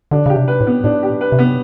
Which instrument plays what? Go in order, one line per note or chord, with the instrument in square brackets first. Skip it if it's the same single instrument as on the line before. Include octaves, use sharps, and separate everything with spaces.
[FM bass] D3 [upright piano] D4
[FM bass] C#3 [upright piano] G4
[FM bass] C3
[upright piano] B4
[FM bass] A2
[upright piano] B3
[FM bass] A2 [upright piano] D4
[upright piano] G4
B4
[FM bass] C3
[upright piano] B3